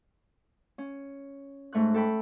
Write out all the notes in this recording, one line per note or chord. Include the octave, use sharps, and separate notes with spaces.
C#4
G#2 A3 C#6 F#6
A4 G5 B5